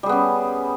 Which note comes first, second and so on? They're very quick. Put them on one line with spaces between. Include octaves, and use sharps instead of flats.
G3 G#4 B3 C#4